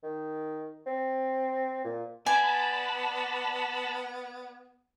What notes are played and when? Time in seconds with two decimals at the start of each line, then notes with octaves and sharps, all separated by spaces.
0.03 D#3
0.86 C4
1.84 A#2
2.26 B3 D5 G#5 A5 B5